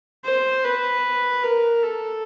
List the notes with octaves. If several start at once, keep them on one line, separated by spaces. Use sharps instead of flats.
C5
B4
A#4
A4